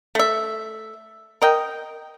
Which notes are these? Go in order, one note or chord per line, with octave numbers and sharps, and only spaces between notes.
A3 E5
A#4 D#5 G5